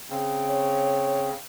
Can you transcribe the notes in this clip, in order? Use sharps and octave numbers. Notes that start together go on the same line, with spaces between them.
C#3 C4
C#5